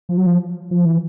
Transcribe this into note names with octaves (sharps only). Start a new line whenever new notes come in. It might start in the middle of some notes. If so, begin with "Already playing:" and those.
F3
F#3
F3
F3
E3